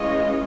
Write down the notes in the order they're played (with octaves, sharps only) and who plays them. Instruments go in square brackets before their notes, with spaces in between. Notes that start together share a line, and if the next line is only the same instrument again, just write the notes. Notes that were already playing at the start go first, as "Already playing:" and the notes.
Already playing: [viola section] E3 G#3 C#4 F4 C#5 D#5